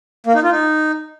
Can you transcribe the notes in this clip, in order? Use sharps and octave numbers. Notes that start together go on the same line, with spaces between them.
A#3
D#4
F4
D#4